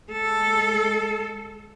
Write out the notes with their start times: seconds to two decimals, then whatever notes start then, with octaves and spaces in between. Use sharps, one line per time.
0.12 G#3 A4